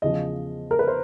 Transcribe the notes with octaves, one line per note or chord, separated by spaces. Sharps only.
E2 C#3 F3 D#5
A#4
B4
C5